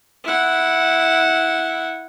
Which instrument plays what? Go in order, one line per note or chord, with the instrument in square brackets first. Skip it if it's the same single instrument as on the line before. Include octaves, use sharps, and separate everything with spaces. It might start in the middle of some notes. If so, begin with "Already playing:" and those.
[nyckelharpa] E4 F#5